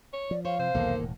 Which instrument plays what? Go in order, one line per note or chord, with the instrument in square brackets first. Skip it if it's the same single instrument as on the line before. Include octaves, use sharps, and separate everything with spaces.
[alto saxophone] C#5
[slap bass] F3 [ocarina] D5
[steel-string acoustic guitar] C5 [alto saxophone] C#5 [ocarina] F5
[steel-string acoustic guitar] C3 [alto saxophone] C5
[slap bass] B1 E2 C3 [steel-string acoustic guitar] D#3 A#3 A4
[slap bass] E1 A2